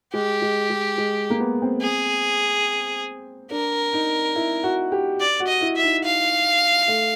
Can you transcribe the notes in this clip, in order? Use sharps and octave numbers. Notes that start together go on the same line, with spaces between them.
G#3 G4
G#3
G#3
G#3
A#3
B3
C4
G#4
D4 A#4
D#4
E4
F#4
G4
D5
F#4
D#5
E4
E5
D#4
F5
A3